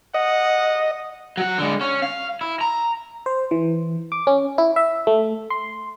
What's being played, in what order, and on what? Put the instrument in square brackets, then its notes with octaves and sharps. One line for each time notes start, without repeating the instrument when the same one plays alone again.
[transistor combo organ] D#5 [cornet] F#5
[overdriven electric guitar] F#3 F#5
D3 G#3
C#4
F5
E4
A#5
[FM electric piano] C5
E3
D6
C#4
E4
E5
A3
C6